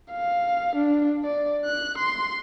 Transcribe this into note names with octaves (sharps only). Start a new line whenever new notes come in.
F5
D4
D5
F#6
C6